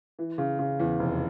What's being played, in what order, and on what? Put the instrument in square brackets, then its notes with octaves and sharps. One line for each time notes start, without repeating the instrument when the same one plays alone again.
[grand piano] E3
C#3
C#3
E2
F1